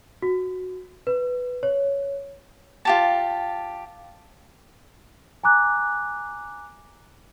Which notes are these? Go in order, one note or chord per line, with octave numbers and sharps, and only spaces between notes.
F#4
B4
C#5
F4 G4 A5
G#5 A#5 D6 F#6